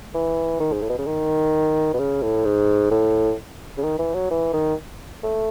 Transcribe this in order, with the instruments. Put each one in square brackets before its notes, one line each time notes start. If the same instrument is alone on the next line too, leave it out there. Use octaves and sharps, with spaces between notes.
[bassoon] E3
D#3
G#2
A2
B2
C#3
D#3
B2
C#3
A2
G#2
A2
C#3
D#3
E3
F#3
E3
D#3
A3